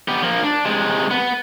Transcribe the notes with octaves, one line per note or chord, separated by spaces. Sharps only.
B3 G4
F3 A#3
D4
C3 G#3
B3